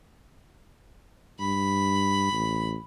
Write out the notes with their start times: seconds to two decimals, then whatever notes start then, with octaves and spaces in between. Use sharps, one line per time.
1.40 G2 B5
2.32 A1